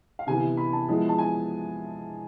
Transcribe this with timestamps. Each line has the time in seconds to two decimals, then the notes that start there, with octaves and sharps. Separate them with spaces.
0.19 F5
0.27 C3 E3 B3 G#5
0.57 B5
0.73 A5
0.88 F3 G#3 B3 E4
1.09 A5
1.19 G#5